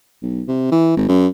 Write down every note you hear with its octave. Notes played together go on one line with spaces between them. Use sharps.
B1
C3
E3
G#1
F#2